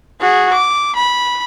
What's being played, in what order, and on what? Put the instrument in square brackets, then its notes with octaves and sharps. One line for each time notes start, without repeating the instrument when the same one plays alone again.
[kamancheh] F#4 G#4
D6
B5